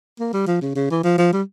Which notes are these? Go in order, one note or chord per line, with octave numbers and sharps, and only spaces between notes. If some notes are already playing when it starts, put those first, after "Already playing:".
A#3
G3
F3
C#3
C#3
E3
F3
F3
G3